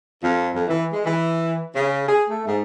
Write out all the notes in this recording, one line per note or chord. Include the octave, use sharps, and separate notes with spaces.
F2
F2
E3
G#3
E3
C#3
G#4
A3
G#2